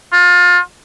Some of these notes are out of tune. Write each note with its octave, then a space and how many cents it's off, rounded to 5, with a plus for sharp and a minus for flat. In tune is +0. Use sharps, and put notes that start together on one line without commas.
F4 +30